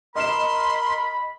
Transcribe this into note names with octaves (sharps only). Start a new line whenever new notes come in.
A#4 D#5 B5 C6 F6 E7